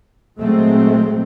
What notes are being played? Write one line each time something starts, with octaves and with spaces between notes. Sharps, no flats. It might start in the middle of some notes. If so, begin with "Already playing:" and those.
A#2 F#3 G#3 A3 C4